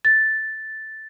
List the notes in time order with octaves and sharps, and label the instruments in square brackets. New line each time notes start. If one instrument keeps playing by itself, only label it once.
[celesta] A6